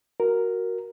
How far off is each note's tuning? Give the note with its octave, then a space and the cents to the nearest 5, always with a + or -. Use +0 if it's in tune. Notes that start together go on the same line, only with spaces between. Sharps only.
F#4 +0 A#4 +0